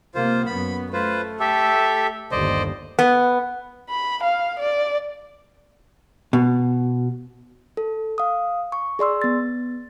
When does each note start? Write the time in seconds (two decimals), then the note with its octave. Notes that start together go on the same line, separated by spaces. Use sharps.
0.15 C3 A#3 F4 C5
0.46 F#2 B3 B5
0.93 A3 F4 B4 C5
1.40 G4 A4 E5
2.32 G1 D#2 C5 D5 D#5
2.99 B3
3.89 B5
4.23 F5
4.59 D5
6.33 B2
7.77 A4
8.18 F5 D#6
8.72 C#6
8.99 G#4 D5 C6 E6
9.22 B3 A6